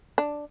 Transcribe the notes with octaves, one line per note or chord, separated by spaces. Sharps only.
D4